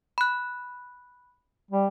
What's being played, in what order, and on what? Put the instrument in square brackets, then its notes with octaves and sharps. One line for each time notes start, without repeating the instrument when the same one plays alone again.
[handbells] B5 F#6
[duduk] G3